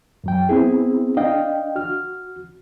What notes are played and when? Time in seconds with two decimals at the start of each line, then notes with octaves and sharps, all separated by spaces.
0.24 F#2 F#3 G5
0.49 B3 C4 E4 G#4
1.17 D4 D#5 F5 G5
1.76 F#4 F6